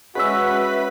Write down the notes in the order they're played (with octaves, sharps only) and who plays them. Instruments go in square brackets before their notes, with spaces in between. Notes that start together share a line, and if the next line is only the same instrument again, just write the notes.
[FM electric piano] G#3 C#4 E5 [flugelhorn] F#4 [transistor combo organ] B4